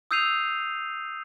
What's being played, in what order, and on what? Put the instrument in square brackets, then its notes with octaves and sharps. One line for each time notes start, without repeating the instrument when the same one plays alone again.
[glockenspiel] D#6 E6 G6 C7 D#7 F7